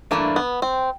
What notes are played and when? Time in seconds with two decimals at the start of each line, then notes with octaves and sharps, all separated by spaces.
0.11 G2 E3 A3 A#3 D4
0.36 B3
0.62 C4